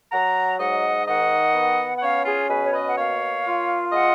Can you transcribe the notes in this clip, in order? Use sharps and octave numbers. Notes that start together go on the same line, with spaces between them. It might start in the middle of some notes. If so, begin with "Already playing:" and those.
F#3 F#5 A#5
G#2 D#5 F#5
D#3 D#5 F#5
B3
F#5
C#4 C#5 F5
F4 G#4
B2 G#4 B4
C#5
B4 D#5
F#5
A#3 C#5 F5
F4
G#3 D#5 F#5